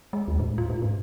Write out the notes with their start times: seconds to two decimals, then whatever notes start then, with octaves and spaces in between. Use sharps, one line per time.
0.13 G#3
0.28 D#2
0.39 A2
0.58 F4
0.70 A2
0.82 G#2